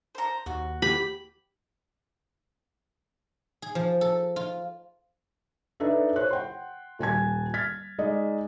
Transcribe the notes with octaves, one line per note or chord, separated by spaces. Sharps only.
C5 A#5
D#2 F#4
G4 B5
G#4
F3
A4
F4
D4 D#4 A4 B4 D5 E5
C5 C#5 F#6
F#5 G5 C6
D#1 G#5 A5 G#6
F6 G#6 A6 B6
G#3 D#4 D5 D#5